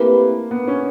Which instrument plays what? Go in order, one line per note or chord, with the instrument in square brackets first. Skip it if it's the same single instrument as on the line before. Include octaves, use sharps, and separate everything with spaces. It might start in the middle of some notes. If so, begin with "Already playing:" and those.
Already playing: [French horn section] A3 C4 E4 G4 B4 [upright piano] A#3
[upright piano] B3
C#4